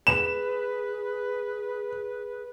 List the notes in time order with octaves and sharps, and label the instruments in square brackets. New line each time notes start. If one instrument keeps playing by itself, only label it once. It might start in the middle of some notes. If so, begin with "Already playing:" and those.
[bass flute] G#4 [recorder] B4 [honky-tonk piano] E7